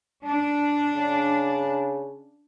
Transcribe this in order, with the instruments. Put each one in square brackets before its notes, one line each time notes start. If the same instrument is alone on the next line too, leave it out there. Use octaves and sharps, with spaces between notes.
[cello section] D4
[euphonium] C#3